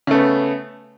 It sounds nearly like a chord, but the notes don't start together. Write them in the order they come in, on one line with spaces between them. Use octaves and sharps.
C#3 A3 B3